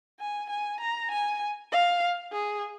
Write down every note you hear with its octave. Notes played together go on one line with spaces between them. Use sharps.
G#5
G#5
A#5
G#5
F5
G#4